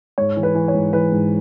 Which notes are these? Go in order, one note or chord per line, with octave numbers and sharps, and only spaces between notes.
G#2 C#5
E3
B4
E3
C#5
G#2
E3 B4
G#2